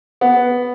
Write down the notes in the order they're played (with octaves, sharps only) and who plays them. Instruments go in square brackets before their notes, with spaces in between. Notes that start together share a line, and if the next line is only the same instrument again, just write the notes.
[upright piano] B3